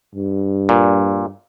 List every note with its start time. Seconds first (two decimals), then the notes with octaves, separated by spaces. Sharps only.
0.14 G2
0.69 A#2